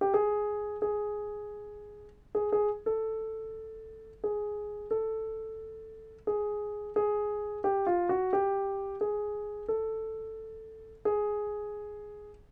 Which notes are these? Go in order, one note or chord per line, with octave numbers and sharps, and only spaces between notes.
G4
G#4
G#4
G#4
G#4
A4
G#4
A4
G#4
G#4
G4
F4
F#4
G4
G#4
A4
G#4